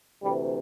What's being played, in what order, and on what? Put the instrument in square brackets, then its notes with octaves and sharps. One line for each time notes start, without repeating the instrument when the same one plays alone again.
[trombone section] D2 C3 E3 G3